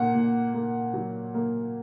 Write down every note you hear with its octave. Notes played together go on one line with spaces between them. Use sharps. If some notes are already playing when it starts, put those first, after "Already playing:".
Already playing: A#2 A#3 F#5
A#2
A#3
F#3
A#3